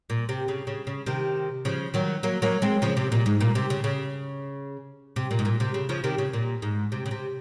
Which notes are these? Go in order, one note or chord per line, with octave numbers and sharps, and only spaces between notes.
A#2
C3
C#3
C#3
C#3
C3 D#3
C#3 F3
D#3 F#3
F#3 A#3
F#3 A#3
G#3 C4
C#3 F3
C3
A#2
G#2
A#2
C3
C#3
C#3
C3
A#2
G#2
A#2
C3
C#3
C#3 F3
C3 D#3
C#3
A#2
G#2
C3
C#3
C3